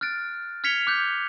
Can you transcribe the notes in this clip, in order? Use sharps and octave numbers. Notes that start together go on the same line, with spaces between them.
F6 F#6 A6 D7
F6 G#6 B6 C#7 F7 G7
D6 F#6 G6